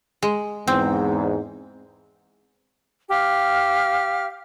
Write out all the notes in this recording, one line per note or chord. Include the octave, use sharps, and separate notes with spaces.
G#3
E2 G#2 C4
G4 F5 F6